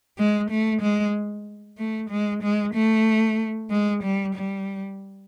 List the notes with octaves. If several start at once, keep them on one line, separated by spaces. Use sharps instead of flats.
G#3
A3
G#3
A3
G#3
G#3
A3
G#3
G3
G3